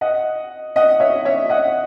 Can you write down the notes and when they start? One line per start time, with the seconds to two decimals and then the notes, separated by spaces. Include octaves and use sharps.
0.01 D#5 F#5
0.76 D#5 F#5
1.00 C#5 E5
1.25 C#5 E5
1.49 D#5 F#5